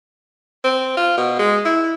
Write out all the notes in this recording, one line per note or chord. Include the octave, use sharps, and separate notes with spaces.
C4
F4
B2
G#3
E4